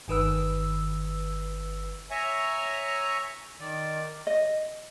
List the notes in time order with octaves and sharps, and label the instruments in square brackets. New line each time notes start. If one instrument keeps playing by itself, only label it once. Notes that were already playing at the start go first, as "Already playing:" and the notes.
[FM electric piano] G1 D#3 B4 E6
[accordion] C#5 E5 G#5 A#5 C#6
D#3 D5
[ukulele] D#5